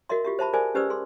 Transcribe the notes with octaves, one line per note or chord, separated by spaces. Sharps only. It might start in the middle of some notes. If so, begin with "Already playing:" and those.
F#4 A#4 D#5 E5 C6
F4 G4 E5
C5 E5 A5 B5
G#4 A#4 C5 D5 E5 G#5
C#4 G4 B4 C5 D5 E6
G#4 C6